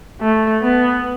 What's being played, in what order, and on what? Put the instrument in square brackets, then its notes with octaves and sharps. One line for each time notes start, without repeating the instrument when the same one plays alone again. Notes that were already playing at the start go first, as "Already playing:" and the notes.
[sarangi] A3
B3